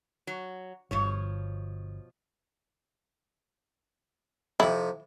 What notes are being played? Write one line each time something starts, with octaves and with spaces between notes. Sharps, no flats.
F#3
G1 B2 F3 C#5
F2 C3 E4